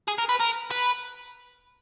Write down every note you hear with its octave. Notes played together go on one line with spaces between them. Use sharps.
G#4
A#4
B4
A#4
B4